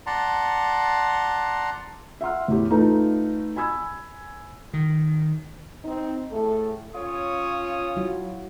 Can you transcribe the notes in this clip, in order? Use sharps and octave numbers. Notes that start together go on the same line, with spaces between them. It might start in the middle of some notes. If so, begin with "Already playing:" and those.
D5 F#5 A5 A#5 C6
E5 F#5 C6 F6
E2 A2 G4
A3 D#4 F4 A4 B4
G#5 B5 E6 G#6
D#3
C4 D#4
A2 A3 G#4 A4
C#4 F4 C#5 D#6
F#3 E4